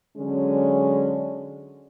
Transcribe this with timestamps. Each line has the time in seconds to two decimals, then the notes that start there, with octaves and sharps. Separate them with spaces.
0.17 D3 F#3 G#3 C#4